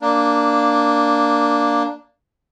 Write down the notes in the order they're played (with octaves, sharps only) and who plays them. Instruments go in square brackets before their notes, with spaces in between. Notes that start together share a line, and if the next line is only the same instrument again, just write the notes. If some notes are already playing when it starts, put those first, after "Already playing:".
[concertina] A#3 D4